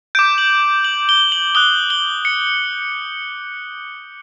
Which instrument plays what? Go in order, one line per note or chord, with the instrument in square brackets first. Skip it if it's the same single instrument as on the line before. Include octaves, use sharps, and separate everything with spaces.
[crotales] D6 G6 D7
F#7
F#7
G7
F#7
D#6 F#6 G7
G7
C#7